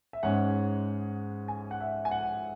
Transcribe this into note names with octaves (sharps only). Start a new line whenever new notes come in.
E5
G#2 G#3 C#4 F#5
G#5
F#5
E5
G#5
F#5